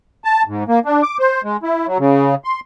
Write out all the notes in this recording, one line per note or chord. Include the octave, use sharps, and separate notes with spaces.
A5
G#2
A#3
D4
D6
C5
G#3
E4
F#3
C#3
C6